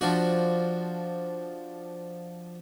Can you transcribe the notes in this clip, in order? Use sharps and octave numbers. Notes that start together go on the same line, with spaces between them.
F3 D4 F#4